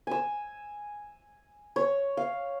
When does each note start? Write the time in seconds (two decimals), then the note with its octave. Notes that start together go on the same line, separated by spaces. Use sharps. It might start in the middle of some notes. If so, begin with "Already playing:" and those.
0.07 G#5 E6
1.76 C#5
2.17 F5